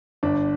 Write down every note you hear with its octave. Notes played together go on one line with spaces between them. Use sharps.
G1 D4